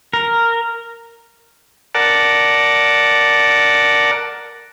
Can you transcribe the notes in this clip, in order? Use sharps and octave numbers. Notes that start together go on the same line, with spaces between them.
A#4
A#4 D5 F#5 A5